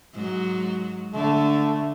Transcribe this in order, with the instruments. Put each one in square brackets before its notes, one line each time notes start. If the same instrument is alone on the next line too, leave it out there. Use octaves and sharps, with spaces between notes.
[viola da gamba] G#2 F#3
[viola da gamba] D3 [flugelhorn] A3